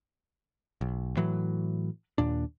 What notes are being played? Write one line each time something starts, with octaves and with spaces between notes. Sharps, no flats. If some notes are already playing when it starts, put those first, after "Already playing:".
B1
A2 E3 F#3
D#2 A#2 D4